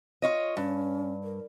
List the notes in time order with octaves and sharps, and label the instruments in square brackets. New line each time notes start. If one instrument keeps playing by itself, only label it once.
[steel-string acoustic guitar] F4 C#5 D#5
[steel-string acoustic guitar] G2 [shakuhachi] C#4
[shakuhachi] A#4